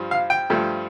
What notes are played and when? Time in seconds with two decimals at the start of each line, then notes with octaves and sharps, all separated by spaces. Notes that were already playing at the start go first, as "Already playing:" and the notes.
Already playing: G2 F3
0.11 F5
0.30 G5
0.50 G2 F3 A3